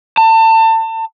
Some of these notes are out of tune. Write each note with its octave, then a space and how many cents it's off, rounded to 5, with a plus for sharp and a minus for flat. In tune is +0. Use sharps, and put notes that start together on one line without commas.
A5 +30